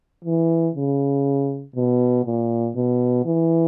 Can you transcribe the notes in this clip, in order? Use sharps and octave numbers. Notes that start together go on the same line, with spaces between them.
E3
C#3
B2
A#2
B2
E3